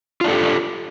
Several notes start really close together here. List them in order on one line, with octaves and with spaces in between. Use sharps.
F4 D4 A4 G4